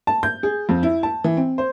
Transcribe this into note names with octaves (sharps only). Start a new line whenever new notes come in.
A5
G6
G#4
F2
E4
A5
E3
C4
C5